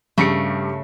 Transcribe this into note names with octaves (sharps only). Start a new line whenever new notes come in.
G2 C#3 A3 G4 C#7